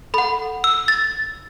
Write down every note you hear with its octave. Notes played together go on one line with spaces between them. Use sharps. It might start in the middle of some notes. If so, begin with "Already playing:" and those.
A4 F#5 B5
E6
A6